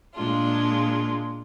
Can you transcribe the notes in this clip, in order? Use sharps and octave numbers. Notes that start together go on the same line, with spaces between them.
A#2 G#3 D4 F4